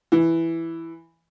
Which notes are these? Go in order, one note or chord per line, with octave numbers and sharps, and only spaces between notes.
E3